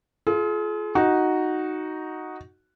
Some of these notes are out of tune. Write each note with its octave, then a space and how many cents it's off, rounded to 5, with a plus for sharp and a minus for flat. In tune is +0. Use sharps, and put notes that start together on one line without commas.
F4 -15 G#4 +40
D#4 +0 F#4 +0